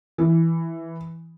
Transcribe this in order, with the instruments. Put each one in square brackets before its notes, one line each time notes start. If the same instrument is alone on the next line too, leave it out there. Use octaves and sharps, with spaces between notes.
[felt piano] E3